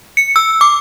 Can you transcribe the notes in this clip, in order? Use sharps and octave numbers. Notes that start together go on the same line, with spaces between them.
C#7
E6
D6